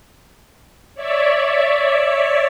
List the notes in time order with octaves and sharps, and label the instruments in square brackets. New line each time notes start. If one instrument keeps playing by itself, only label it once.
[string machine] C#5 D5 E5